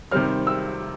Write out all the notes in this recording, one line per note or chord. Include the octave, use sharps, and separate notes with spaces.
C3 D#3 G3 C4 F6
E6